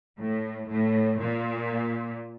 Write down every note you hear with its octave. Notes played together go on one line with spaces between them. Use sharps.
A2
A2
A#2